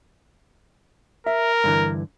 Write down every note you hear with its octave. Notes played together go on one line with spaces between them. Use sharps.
A#4 E5
G2 D3 E3